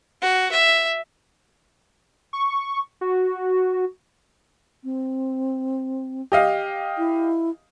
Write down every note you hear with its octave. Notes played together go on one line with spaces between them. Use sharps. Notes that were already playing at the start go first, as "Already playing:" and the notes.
F#4
E5
C#6
F#4
C4
G4 D#5 F5
E4